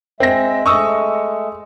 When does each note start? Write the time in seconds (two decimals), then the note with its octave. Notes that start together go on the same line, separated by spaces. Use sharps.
0.20 G#3 C4 E5 A#6
0.66 G#3 A3 C#6 D#6 E6